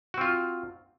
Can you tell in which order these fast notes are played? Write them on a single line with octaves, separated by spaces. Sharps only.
F#4 C4 F4